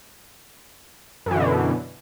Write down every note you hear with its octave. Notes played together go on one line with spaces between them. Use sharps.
F#2 B2 D3 E3